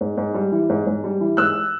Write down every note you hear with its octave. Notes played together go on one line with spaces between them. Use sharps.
G#2
G#2
G3
E3
G#2
G#2
G3
E3
G#2 E6 F#6